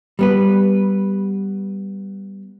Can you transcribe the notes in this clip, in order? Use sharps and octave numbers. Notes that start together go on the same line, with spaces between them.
G3 B3 B4